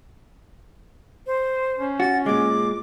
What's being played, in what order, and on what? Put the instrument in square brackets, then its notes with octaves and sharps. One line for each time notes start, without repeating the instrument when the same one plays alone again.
[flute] C5
[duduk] C#4
[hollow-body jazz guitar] F#4 [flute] A6
[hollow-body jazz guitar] A#2 G#3 [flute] D6